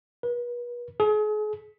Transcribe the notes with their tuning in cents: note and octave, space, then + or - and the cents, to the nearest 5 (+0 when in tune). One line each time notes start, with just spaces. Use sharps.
B4 -40
G#4 +40